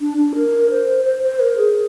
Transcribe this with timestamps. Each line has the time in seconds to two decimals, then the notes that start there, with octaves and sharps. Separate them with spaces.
0.01 D4
0.17 D4
0.35 A#4
0.71 C5
1.05 C5
1.23 C5
1.40 A#4
1.57 G#4